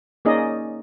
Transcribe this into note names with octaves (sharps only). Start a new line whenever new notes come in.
A#3 C#4 D#4 G#4 D5 D#5